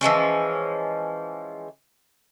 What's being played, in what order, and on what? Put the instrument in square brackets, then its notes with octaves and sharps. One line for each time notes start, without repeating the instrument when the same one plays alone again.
[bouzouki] E3 F3 G#3 C#4